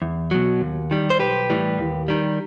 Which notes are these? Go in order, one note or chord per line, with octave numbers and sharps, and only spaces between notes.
E2
B2 F#3
D#2
D#3 G3
C5
B1 G4 B4
A2 E3 G3
D#2
D#3 G3